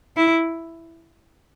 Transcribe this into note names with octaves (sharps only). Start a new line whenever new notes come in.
E4